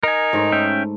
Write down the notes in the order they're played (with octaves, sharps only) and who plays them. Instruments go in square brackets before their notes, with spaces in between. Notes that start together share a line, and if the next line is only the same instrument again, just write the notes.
[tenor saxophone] D#4 [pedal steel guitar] A#4 G#5
[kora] G#2 A3
[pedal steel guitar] C#4 E5 G5